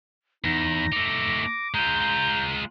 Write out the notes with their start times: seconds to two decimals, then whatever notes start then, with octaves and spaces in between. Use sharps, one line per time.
0.44 E2 D#4 A#6
0.92 A3 D#4 D6
1.74 G#3 F4 A#5 G6